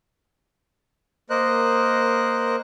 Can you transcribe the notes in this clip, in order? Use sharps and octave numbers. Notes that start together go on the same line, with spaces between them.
A#3 A#4 C5 D#5 F#6